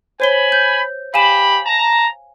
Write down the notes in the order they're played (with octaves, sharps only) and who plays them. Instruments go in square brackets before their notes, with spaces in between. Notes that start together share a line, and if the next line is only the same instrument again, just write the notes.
[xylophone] C5 C#5 G7 [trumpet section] G#5 B5
[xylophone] G6
[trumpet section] G4 B5 [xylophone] F5 G#5 E7
[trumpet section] A5 A#5